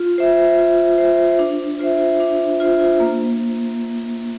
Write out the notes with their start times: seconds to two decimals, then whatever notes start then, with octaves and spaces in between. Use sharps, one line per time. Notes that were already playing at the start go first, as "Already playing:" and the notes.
Already playing: F4
0.18 C5 E5
0.59 F4
0.98 C5 E5
1.39 D4
1.79 F4 C5 E5
2.20 D4
2.60 F4 C5 E5
3.00 A#3